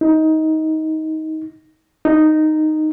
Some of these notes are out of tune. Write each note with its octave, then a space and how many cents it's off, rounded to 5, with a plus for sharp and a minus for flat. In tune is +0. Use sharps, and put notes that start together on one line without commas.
D#4 +20
D#4 -5